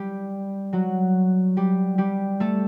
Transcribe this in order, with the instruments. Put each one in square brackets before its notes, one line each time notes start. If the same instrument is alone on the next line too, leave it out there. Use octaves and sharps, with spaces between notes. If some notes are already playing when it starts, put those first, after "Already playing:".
Already playing: [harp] G3 G4
F#3 F#4
G3 G4
G3 G4
A3 A4